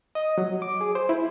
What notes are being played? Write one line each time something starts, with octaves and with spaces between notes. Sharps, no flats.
D#5
F#3
D6
G#4
C5
E4